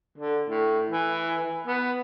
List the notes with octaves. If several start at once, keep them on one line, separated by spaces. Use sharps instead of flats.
D3
A2
E3
B3